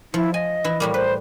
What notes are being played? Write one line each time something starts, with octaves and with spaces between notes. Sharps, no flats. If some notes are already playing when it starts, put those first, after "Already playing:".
F3 E4
D#5 G#5
E3 E4
A2 G3 A#3
B4 C5